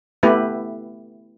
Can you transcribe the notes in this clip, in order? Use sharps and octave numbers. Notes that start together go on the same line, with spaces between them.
A3 B3 E4 G4 B4